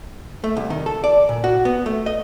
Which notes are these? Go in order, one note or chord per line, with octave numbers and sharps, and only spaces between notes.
A3
C2
D#3
A4
D5
A#2
F#4
B3
A3
D#5